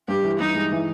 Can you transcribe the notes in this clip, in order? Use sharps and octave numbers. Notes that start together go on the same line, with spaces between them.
G2 G4
E3
G2 D#4
G#3
E3